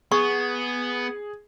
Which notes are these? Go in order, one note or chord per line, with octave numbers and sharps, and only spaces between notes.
B3 G#4 C#6